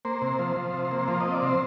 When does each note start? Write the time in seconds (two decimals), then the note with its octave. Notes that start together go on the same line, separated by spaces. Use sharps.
0.05 A#3 C5
0.22 C3
0.39 F3
0.57 F3
0.74 C3
0.91 A#3
1.08 F3 C5
1.21 C4 D#5
1.33 D5
1.42 C3 C5